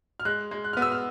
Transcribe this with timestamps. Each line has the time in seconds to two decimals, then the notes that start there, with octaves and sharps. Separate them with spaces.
0.20 F6
0.25 G#3 F#6
0.51 G#3
0.64 F#6
0.73 B3 F6
0.82 E6
0.92 F6